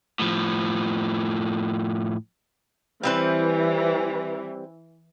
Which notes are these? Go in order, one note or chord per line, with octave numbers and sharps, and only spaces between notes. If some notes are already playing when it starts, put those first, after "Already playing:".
A2 F3
E3 G3 C4 B4